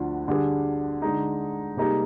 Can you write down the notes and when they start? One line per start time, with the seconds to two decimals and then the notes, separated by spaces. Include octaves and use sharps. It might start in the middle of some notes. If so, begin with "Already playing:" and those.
Already playing: D2 D3 F3
0.28 D3 G3 D4 G#4
1.02 D3 G#3 D#4
1.76 C3 G3 A#3 D#4 G#4